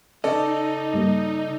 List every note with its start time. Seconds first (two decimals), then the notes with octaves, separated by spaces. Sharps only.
0.24 C#3 C#4 D#4 A4 D5 D#5
0.94 G2 G3 A#3